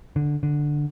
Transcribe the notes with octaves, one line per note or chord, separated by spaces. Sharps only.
D3
D3